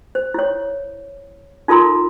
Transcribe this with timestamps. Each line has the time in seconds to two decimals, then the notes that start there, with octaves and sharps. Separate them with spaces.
0.15 C5
0.34 E4 C#5
1.68 D#4 F4 A4 A#4 A#5 C6